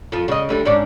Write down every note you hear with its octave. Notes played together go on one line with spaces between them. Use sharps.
F2 F3
C#3 D#5
D2 D3 G3
G#2 C#4 D4